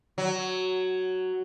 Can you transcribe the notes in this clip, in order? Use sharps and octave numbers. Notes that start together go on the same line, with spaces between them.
F#3